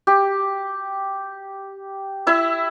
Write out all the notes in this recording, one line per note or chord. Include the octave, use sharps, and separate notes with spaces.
G4
E4 E5